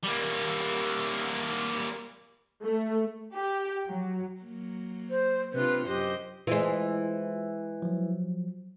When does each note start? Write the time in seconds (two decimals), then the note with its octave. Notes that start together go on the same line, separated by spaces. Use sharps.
0.03 G3 A#3
2.64 A3
3.34 G4
3.87 F#3
4.41 F#3 A#3
5.10 C5
5.53 C3 D4 F4 B4
5.87 F#2 G4 C5 D#5
6.47 E3 G#3 F4 C5
7.82 F3 F#3